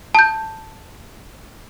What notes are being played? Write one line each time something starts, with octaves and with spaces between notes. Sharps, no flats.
A5 G6